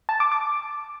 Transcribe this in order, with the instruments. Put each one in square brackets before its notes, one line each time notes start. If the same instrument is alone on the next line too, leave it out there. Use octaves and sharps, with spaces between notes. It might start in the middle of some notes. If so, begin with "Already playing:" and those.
[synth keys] A5
D6
D6